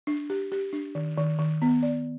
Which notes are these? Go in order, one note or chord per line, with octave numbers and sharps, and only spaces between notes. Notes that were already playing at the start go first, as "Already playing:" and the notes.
D4
G4
G4
D4
D#3
D#3
D#3
B3
D5